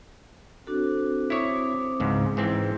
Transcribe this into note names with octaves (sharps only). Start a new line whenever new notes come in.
C4 D4 F#4 A4
E4 C#5 D6 D#6
C#2 G#2
G#2 E3 C4 E4